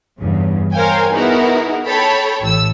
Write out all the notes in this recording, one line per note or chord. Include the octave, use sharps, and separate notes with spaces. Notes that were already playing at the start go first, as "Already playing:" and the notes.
E2 G2 C#3
A#4 C5 C#5 F5 G5 G#5
B3 D#4 E4 F#4 G#4 A#4
A4 C#5 G5 A5 B5
A1 E6